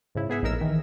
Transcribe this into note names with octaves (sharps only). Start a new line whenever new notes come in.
G#2 C#3 E4
B3 G#4 E5 F#5
A#1 A2 D#4 A#4 E6
D#3 E3